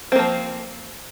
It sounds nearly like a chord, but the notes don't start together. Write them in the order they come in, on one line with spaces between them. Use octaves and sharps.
C4 A#3 F3